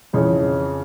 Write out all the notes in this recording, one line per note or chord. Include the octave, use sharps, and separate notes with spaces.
F2 C#3 E3 C#5